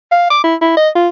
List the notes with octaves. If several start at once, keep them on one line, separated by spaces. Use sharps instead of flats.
F5
D6
E4
E4
D#5
F4